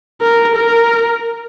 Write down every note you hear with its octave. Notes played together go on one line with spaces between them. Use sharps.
A#4
A#4